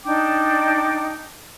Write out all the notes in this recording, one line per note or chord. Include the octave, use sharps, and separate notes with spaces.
D4 D#4 G5 D6